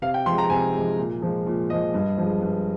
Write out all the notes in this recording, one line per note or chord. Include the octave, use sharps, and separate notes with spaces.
C3 F5
G5
F3 G#3 C6
A#5
C3 G#5
F3 G#3
A#2
F3 G#3
A#2
F3 G#3 D#5
G2
F3 G#3
G2